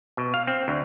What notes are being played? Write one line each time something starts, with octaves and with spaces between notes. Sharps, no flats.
B2
F5
C4
D2